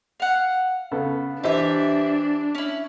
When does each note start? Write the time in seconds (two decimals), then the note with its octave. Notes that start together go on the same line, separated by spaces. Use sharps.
0.20 F5 F#5
0.92 C#3 B3 A4
1.43 E3 D4 G4 C5 D#5 E5
2.55 C#4 E4